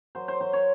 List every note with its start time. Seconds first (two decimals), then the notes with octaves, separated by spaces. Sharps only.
0.15 F#3 C5
0.28 C5
0.41 F#3 C5
0.53 C#5